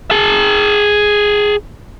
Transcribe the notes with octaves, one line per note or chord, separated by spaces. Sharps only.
G#4 A5